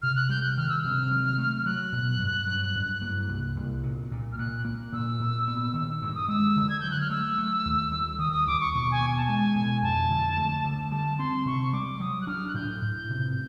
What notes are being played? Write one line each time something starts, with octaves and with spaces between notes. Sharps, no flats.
C3 F6
F#6
G3 G6
F#6
D#3 F6
E6
C3 F6
F#3
A3
F6
F#3 F#6
B2
G2
F#3
G2
A#3
C2
C2
A#2
A#2
F6
A#2 F#6
A#3
A#2 E6
A#2
B3
D#3
G2 E6
D#6
G#3 E6
D3
G#6
F#3 G6
F#6
F6
A3 E6
A3
D#2
G3
D#3 D#6
D#6
D#2 D6
C#6
B2 C#6
G#5
B3
G#5
A5
G#3 G#5
B2
F2 A5
D3
A3
D3
G3 A5
C4 C6
C3 C#6
G3 D6
F#3 D#6
F#6
D4 F6
F#6
A2 G6
A2
C3